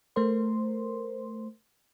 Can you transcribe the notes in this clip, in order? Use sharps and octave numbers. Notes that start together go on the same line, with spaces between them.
A3 A#4 C5 C6